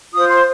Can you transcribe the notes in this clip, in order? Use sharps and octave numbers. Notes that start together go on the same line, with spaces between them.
F4 C5 D#6
C6